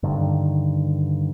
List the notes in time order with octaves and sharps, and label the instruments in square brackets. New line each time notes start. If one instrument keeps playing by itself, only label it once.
[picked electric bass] G2 D3 D#3